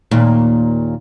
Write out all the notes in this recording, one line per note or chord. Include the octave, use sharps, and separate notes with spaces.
D#2 A#2